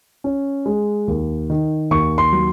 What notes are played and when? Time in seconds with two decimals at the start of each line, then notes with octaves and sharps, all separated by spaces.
0.24 C#4
0.66 G#3
1.08 D#2
1.50 D#3
1.91 D#2 C#6
2.18 C6
2.32 F#3